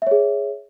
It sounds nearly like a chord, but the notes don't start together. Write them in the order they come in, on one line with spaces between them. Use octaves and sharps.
E5 C#5 G#4